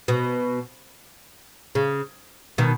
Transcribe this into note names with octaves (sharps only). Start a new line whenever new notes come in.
B2
C#3
B2 D#3